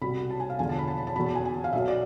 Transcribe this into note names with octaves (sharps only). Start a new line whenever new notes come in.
C2 B2 B5
A5
G#5
F5
E1 E2 D3 F3 G#5
A5
B5
A5
B5
A5
E2 B2 B5
A5
G#5
G#5
F5
B1 B2 E5
D5